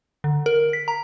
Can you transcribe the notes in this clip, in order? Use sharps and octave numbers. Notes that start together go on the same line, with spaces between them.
D3
A#4
B6
A#5